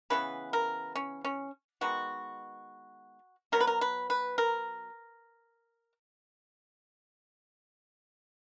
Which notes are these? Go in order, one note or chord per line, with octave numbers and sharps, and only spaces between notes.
C#3 E3 B3 B4
A#4
C#4
C#4
D#3 G#3 B3 F#4
B2 F#3 B3 A#4
B4
A#4
B4
B4
A#4